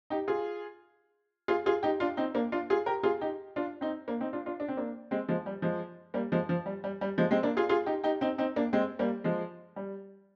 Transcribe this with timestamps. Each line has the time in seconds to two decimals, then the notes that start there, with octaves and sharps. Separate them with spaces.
0.10 D#4 G4
0.28 F4 G#4
1.48 F4 G#4
1.66 F4 G#4
1.83 D#4 G4
2.00 D4 F4
2.17 C4 D#4
2.34 A#3 D4
2.52 D4 F4
2.70 F4 G#4
2.86 G4 A#4
3.03 F4 G#4
3.21 D#4 G4
3.56 D4 F4
3.81 C4 D#4
4.08 A#3 D4
4.21 C4 D#4
4.33 D4 F4
4.46 D4 F4
4.60 D4
4.68 C4
4.77 A#3 D4
5.11 G#3 C4
5.28 F3 G#3
5.46 G3
5.62 F3 G#3
6.14 G3 A#3
6.32 F3 G#3
6.49 F3
6.66 G3
6.84 G3
7.01 G3
7.18 F3 G#3
7.31 G#3 C4
7.43 A#3 D4
7.57 F4 G#4
7.69 F4 G#4
7.86 D#4 G4
8.04 D#4 G4
8.21 C4 D#4
8.38 C4 D#4
8.56 A#3 D4
8.73 G#3 C4
8.99 G3 A#3
9.24 F3 G#3
9.76 G3